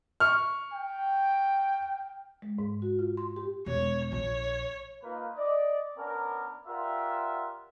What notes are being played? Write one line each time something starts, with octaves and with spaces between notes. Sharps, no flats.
C#6 F6
G5
G#3
G#2
F#4
F4
C6
G4
E1 C#5
A#1 C#5
A#3 D#4 F4 A#4 B4
D5 D#5
B3 C#4 D4 A#4
F4 G4 A#4 D5 E5 F#5